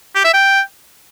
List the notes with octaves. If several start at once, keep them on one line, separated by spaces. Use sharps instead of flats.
G4
E5
G5